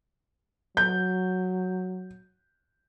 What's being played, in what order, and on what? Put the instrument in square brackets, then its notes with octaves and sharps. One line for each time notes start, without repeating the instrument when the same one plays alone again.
[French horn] F#3 [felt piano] G6